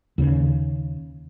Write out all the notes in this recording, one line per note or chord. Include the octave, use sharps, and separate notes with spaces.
D#2 C#3